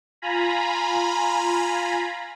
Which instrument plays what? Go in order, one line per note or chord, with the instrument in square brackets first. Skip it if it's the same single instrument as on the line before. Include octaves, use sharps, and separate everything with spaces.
[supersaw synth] F4 G#5 A#5 B5